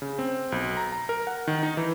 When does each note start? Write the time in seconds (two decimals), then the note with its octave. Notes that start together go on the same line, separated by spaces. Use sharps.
0.02 C#3
0.19 C4
0.52 B1
0.77 A#5
0.92 A#5
1.09 A#4
1.27 F#5
1.47 D#3
1.63 D#4
1.77 E3